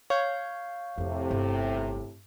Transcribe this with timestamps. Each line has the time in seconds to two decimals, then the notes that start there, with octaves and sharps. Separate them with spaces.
0.10 C#5 F5 G6
0.98 F2 A2 C3 F3
1.31 G1